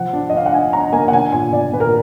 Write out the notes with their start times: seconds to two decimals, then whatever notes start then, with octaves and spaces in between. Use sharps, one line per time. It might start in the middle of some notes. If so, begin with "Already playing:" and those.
Already playing: F3 F#5
0.13 D4
0.30 D#5
0.33 D4 F5
0.46 F#5
0.53 D4 G#5
0.73 D4 A#5
0.93 A#3 G#5
1.08 F#5
1.13 D4 G#5
1.32 A#2 G#5
1.53 A#2 D5
1.72 A#2 B4
1.80 A#4